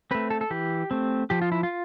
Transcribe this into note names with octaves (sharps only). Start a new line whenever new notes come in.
A3 C4 B4
A4
A4
E3 G4
A3 C4
F3 G4
F4
E4
F4